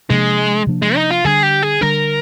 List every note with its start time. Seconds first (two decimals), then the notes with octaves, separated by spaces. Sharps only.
0.10 C3 F3 G#3 A#3 D4
0.67 C3 F3 A#3 D4
0.82 G#3
0.96 D#4
1.11 F4
1.25 D3 G3 D4 G#4
1.43 G4
1.63 G#4
1.81 D3 G3 D4 A#4